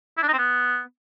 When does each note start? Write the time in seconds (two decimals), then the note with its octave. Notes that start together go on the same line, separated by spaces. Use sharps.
0.18 E4
0.23 D4
0.28 D#4
0.33 C4
0.38 B3